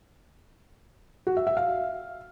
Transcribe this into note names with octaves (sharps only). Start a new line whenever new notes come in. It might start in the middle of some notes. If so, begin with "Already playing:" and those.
F#4
E5
E5
F5